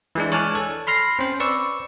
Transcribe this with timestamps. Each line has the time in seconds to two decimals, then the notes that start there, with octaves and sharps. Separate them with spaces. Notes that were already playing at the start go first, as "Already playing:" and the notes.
0.15 E3 G#3 D4
0.32 C#5 D5 G#5 A5 F6 F#6
0.55 A4
0.87 B5 C6 F6 A#6 C7
1.19 C4 C#4 C5
1.40 B4 D5 C#6 E6